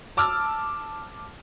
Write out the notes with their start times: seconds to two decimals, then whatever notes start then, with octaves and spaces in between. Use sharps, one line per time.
0.17 A5 D6 E6 F6